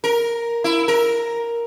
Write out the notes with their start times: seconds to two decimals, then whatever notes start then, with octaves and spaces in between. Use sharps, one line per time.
0.04 A#4
0.64 E4
0.88 A#4